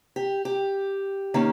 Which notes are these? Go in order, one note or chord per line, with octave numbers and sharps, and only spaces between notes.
G4
G4
D#3 A#3 C#4